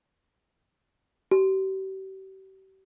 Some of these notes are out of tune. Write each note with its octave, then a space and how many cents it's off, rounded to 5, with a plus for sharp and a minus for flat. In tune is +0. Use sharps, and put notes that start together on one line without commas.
G4 -40